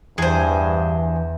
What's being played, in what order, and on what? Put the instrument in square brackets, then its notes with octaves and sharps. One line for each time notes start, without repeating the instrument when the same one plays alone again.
[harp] E2 [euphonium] G2 [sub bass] E3 [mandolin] G#4 C5